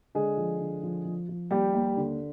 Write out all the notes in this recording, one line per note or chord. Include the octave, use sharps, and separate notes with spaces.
D3 G#3 G#4
F3
D3
F3
F3
F3
D#2 G3 G4
D#2
D3